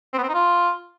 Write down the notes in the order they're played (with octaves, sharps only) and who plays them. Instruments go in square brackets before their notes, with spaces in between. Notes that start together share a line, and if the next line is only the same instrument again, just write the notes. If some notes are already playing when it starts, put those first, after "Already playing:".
[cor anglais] C4
B3
C4
D#4
F4